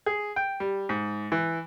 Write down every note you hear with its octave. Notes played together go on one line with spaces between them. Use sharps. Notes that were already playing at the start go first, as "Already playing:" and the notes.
G#4
G5
G3
G#2
E3